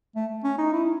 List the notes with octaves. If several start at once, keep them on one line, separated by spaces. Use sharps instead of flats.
A3
C#4
D#4
E4